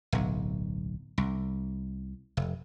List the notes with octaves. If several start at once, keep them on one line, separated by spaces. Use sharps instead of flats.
D1 B1
C2
F1